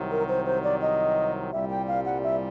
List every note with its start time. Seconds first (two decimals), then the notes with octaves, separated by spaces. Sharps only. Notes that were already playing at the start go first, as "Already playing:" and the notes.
Already playing: C2 C3 D#3 F#3
0.11 A#4
0.29 C5
0.46 C5
0.63 D5
0.82 D#5
1.53 C2 A#2 G3 E5
1.70 G5
1.88 F5
2.05 F#5
2.23 E5